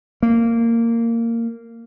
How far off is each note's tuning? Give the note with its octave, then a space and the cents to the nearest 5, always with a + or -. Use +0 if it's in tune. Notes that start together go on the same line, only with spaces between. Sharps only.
A#3 -15